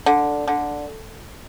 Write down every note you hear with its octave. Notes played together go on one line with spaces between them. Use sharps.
D3
D3